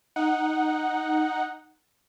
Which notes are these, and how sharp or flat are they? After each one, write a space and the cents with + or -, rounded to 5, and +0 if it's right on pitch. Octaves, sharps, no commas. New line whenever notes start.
D#4 +0 F#5 +0